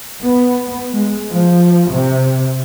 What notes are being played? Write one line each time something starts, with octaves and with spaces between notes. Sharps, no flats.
B3
G#3
F3
C3